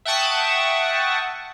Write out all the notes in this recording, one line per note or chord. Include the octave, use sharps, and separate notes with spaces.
E5 F#5 G5 A5 C#6 D#6